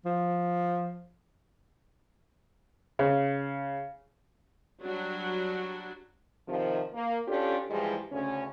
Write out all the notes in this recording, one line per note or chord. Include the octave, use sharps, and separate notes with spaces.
F3
C#3
F#3 G3 D4 F#4
C3 D#3 F3
A#3
C#4 D4 F4 G4 A4
G#2 E3 F3 G3 G#3
D2 C#3 C#4